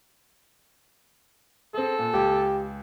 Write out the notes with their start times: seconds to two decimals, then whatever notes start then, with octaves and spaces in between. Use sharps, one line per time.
1.74 C4 G#4 A4
1.99 A#2
2.14 C#2 G4